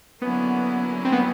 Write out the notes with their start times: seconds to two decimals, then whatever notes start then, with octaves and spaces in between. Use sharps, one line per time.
0.22 D3 F#3 A#3 B3 C#4 E4
1.05 C4
1.12 B3